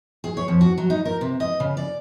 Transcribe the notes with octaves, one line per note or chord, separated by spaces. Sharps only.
G#4
C#5
F2
F#4
F#3
D#4
A#4
C3
D#5
C#3
D5